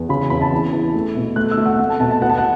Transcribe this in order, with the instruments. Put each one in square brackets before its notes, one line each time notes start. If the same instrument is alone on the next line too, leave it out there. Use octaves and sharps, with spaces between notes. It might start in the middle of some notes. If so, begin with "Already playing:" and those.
Already playing: [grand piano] E2
C#3 B5
E2 B5
A5
E3
E3
A3
B2
A3 F#6
E6
A3
F#5
A3 F#5
A5
B2 A5
A5
B3 F#5
A5
F#5